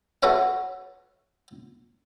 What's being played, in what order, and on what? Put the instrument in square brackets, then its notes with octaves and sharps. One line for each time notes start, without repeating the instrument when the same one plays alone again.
[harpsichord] F#4 A4 B4 C#5 E5 F5